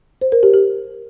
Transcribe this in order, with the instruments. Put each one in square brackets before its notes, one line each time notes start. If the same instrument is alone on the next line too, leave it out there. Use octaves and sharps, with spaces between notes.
[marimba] C5
A#4
G4
G4